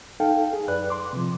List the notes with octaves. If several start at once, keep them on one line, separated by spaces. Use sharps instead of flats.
D#4 A4 F5 G5
G#4
F#2 B4 D5 F#6
C6 D6
C3 F3